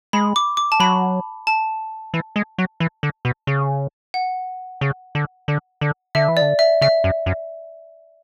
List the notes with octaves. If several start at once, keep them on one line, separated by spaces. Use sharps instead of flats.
G#3 B5
D6
D6
A5
F#3 B5
A5
E3
G#3
F#3
E3
D3
B2
C#3
F#5
C#3
D3
D3
D3
D3 E5
E3
D5
D3
E5
C#3 E5
F#2
F#2